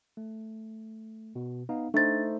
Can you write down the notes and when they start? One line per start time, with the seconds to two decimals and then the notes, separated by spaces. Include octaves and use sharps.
0.17 A3
1.36 B2
1.69 B3 D#4 F5
1.94 A3 D4 D#4 C5 A6